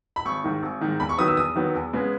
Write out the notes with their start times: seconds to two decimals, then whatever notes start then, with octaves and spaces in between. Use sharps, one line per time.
0.16 B5
0.25 G#1 C#6
0.44 G#2 D#3
0.63 G#1
0.81 G#2 D#3
1.00 E2 B5
1.09 C#6
1.18 D#3 F#3 B3 D#6
1.28 E6
1.37 E2 D#6
1.56 D#3 F#3 B3
1.74 E2
1.93 C#3 G#3 B3